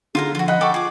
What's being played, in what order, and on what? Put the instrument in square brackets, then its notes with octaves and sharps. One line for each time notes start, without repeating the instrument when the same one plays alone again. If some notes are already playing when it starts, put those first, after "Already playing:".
[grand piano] D3 [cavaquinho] F4 F5 A#5 [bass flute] G#4
[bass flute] F3 [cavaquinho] F4 F#4
[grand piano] D#5 F#5 F#6 [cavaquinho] B5
[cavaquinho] A4 B5 D6 [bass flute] F#5 [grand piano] G5 C#6
[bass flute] F4 [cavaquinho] G#4 D6